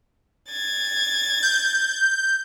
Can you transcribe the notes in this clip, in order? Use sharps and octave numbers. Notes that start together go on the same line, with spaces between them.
G#6 A6
G6